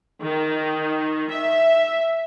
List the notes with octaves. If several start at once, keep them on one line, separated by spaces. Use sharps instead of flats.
D#3
E5